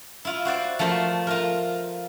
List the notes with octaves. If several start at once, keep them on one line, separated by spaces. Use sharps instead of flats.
E4 F4
F#4 C5 D5
F3 A3 A#4 C5
F4 A#4